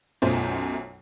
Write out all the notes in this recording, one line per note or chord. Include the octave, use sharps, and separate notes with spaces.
B1 F#2 B2 A3 F4 C5